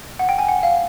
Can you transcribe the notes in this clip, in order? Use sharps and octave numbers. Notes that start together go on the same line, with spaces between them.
F#5
G5
G#5
F#5
F5